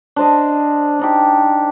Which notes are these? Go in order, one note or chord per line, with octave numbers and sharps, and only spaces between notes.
D4 C5 D#5
D4 D#4 G4